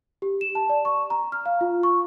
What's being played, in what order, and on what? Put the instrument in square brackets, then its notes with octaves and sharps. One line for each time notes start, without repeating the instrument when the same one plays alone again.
[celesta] G4
E7
A5
D5
C#6
A#5
F6
F5
F4
C#6